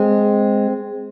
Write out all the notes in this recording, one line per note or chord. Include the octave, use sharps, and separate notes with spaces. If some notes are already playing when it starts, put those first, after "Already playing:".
Already playing: G#3 C4